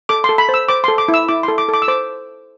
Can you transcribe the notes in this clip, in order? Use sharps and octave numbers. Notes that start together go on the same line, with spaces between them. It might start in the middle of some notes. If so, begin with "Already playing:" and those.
A4 D6
C6
A4
B5
C5
E6
C5 D6
C6
A4
D6
E4
E6
E4 D6
C6
A4
D6
A4 D6
E6
C5 D6